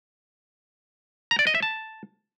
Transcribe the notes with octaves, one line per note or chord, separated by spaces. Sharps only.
A#5
D5
D#5
E5
A5